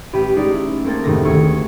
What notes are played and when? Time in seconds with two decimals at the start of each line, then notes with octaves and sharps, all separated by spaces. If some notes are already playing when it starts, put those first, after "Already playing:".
0.13 A1 G4 B5 D#7
0.36 G#3 C#4 D#4 D5
0.54 E4
0.84 A3 A#3 C4 G#4 A4
1.04 F1 G#2 D#3 G#3 A3 A#6
1.25 D#1 D2 G#4 C#6 E6